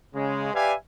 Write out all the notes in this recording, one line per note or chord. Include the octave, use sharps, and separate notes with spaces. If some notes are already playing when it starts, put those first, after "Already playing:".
C#3 G#3
G4 B4 D5 E5 F5 G#5